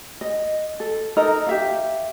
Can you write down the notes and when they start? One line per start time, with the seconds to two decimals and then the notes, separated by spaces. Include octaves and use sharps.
0.21 D#5
0.80 A4
1.17 D#4 A4 A#4 D#5
1.47 G4 E5 F5